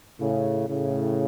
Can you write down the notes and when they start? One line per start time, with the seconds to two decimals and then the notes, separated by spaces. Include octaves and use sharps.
0.20 A2 C#3
0.69 A2 C#3